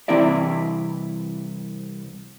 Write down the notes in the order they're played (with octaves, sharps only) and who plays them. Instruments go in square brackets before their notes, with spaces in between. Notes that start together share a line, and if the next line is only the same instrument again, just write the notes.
[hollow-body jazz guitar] C2 E3 C4 E4 D5 E5